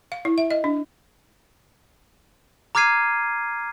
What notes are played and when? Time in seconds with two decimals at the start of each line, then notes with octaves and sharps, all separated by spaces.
0.12 F5
0.25 E4
0.38 E5
0.51 D#5
0.64 D4
2.75 A#5 D6 F6 G#6 C7 D#7